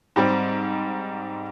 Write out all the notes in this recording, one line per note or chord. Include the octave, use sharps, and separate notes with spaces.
G#2 G3 C4